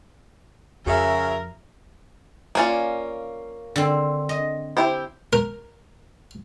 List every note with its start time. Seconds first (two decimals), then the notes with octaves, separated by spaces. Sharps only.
0.86 F2 C#3 F#4 G#4 A#4 E5
2.55 A#3 C#4 F4 D5 F#5 G#5
3.76 D3 C4
4.29 D#5
4.77 E4 G4 C5
5.33 A#4